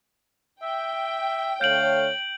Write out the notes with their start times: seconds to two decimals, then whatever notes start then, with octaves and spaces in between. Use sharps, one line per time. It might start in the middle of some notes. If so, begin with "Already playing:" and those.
0.62 E5 G5
1.61 D3 A3 C#5 F5 G6 D7 F#7